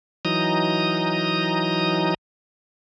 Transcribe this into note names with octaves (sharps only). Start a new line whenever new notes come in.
E3 F#3 D#4 A#5 D#6